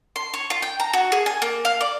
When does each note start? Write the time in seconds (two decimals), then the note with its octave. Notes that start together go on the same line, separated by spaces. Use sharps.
0.16 C6
0.34 C#5
0.50 F4
0.62 G5
0.80 A#5
0.93 F#4
1.12 G#4
1.26 G#5
1.42 A#3
1.65 F5
1.81 D5